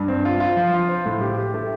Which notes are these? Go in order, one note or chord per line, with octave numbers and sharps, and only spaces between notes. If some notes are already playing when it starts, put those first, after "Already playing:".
Already playing: G2
C4
F4
F4
F3
F4
C5
A2
G4
G4
A3